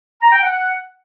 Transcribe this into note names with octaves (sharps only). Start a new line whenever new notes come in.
A#5
G5
F#5